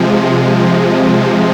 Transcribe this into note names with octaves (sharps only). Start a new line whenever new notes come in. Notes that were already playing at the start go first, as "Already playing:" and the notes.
Already playing: C3 F3 G#3